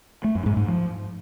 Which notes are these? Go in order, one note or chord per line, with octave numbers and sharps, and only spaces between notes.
A3
F#2
G#2
G#2
F3